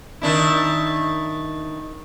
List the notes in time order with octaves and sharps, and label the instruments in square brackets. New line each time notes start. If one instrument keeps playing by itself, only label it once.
[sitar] D#3 D4 E4